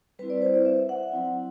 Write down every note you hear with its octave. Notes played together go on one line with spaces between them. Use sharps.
G3 C4 E4 B4
D5
C5
D5
E5
F#5
F#3 C4 E4